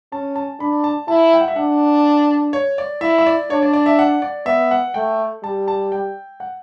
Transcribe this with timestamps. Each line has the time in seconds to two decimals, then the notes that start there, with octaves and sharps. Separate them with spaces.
0.12 C#4 A5
0.36 A5
0.60 D4 B5
0.84 A5
1.08 E4 A5
1.33 G5
1.41 F#5
1.48 E5
1.56 D4 F#5
2.53 C#5
2.78 D5
3.01 E4 E5
3.18 E5
3.26 D5
3.50 D4 C#5
3.62 D5
3.73 D5
3.86 E5
3.99 F#5
4.22 D5
4.46 B3 E5
4.71 F#5
4.94 A3 G5
5.43 G3 A5
5.68 A5
5.92 G5
6.40 F#5